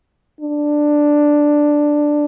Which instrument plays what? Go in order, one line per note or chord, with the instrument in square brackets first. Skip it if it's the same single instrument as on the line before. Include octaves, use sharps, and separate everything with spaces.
[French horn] D4